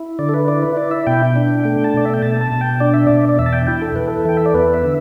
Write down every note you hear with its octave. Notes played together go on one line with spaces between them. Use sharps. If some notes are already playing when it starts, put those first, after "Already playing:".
Already playing: E4
D3 D5
A4
B4
E4 D5
B4
E4 D5
E5
B2 G5
D4
A3 G5
A5
B2 D5
E5
G5
B2 A5
A5
B2
G5
D4 D5
E5
B2 D5
D5
E2 E5
A5
G5
E4 G5
A4
E2 B4
A4
E3 G5
E5
D5
B3 B4
E5
D3